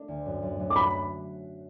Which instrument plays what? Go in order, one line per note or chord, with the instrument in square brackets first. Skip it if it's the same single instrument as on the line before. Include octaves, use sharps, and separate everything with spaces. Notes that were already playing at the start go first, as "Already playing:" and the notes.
Already playing: [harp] A3 D4
D2
F#2
F#2
F#2
[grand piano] D6
[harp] F#4 [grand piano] B5